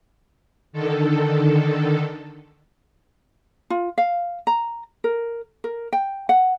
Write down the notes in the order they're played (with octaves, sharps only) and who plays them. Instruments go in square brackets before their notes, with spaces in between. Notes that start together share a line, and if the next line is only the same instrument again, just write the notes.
[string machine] D3 D#3 A4
[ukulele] F4
F5
A#5
A#4
A#4
G5
F#5